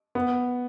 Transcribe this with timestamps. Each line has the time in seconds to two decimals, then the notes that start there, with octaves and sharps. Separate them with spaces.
0.15 B3